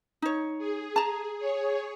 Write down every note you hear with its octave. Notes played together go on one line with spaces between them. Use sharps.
D#4 C#5
G#4
A5 A#5
G#4 C#5